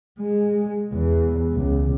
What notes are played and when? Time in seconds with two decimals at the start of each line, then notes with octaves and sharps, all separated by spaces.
0.20 G#3
0.93 E2
1.54 C#2